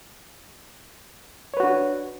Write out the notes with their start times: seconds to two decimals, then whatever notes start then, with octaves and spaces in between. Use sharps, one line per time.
1.54 C#5
1.57 B4
1.60 F#4
1.63 D4